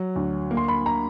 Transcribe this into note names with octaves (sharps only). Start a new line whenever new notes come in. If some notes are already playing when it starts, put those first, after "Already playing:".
Already playing: F#3
D2
A#3
C6
B5
A#5